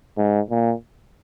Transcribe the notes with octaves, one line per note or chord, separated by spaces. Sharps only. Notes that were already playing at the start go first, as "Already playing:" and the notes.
G#2
A#2